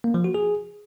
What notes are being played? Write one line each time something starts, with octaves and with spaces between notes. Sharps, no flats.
A#3
F3
F#4
G#4